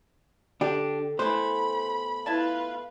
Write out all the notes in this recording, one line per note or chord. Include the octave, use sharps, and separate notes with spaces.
D3 D4 G4
B2 E3 A3 B4 C5 B5
E4 F4 B4 E5 A5